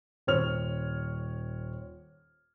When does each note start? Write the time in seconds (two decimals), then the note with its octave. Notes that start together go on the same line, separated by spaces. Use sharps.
0.27 D#1 C5 C#5 F6 F7